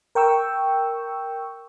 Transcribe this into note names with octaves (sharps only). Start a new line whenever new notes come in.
A#4 G5 C#6 E6